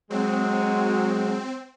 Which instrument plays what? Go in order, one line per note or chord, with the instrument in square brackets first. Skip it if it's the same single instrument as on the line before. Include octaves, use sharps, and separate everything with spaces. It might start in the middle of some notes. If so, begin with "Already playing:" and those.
[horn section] F#3 G#3 [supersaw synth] C4